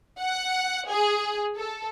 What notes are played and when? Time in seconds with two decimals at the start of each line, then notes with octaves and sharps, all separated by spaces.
0.20 F#5
0.89 G#4
1.57 A4